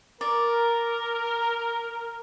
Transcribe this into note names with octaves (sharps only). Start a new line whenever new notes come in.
A#4 D5